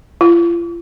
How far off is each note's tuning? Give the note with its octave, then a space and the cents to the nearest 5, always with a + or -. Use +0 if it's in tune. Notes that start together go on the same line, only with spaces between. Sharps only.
F4 -40